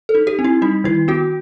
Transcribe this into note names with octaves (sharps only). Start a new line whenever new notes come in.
A4
D#4
G4
C4
E4
G3 D#4
D#3 E4
B3 F#4